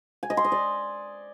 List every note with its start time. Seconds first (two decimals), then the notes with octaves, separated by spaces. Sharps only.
0.23 G#5
0.30 D#5
0.37 C6
0.44 D#5
0.52 D5